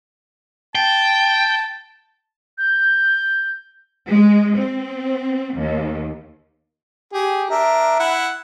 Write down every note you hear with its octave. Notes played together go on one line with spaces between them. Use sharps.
G5 A5
G6
G#3
C4
D#2
G4 G#4
D4 A#4 E5
E4 F#5